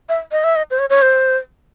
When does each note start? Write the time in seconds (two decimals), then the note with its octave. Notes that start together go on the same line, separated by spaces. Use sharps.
0.09 E5
0.32 D#5
0.44 E5
0.56 D#5
0.71 C5
0.79 C#5
0.90 C#5
1.02 C5